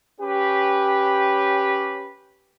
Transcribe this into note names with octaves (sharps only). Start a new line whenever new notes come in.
C#4 G4 B4